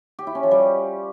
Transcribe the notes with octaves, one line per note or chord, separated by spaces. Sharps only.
G4
E4
C#4
F3
G3